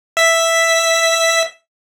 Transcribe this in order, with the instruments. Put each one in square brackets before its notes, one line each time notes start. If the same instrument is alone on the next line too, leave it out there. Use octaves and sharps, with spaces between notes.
[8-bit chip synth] E5 B6